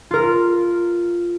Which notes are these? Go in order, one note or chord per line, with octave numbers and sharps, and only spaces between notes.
F4 A#4